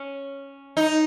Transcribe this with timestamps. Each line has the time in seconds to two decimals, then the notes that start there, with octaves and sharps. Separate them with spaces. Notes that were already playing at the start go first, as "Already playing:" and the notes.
Already playing: C#4
0.77 D#4